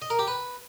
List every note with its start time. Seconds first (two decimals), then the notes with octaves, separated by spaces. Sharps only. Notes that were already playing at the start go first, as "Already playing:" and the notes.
0.02 D#5
0.10 A#4
0.19 G4
0.27 B4